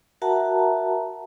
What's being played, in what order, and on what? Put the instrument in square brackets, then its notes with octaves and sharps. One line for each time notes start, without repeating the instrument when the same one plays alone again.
[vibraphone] F#4 A#4 E5 F#5 A5 A#5